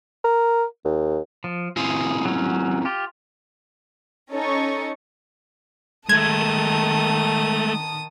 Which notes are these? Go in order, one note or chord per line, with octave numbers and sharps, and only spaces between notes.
A#4
D#2
F3
C4 E4 F4 G#4
F#3 C#4
F4 G4
C#4 D#4 A4 D#5 C#6
D#3 G#3 A3 A5 D#6 G#6